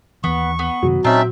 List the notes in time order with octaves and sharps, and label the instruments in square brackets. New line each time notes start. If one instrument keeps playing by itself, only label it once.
[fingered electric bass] D#2 E3 [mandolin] B3 [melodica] C#6
[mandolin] B3
[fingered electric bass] F#2 C3 D#3 [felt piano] F#3
[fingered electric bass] A#2 [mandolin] C4 E5 [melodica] C#4 D#4 A5